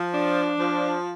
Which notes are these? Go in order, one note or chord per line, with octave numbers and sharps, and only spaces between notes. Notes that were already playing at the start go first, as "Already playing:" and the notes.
Already playing: F3
D4
F3